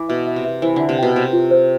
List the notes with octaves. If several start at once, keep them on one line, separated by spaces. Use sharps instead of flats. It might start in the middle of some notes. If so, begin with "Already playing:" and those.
Already playing: E3 D6
B2 E5
E5
C3
E5
E3 C5
D3 E5
C3
B2 G5
C3 C5
F4
C5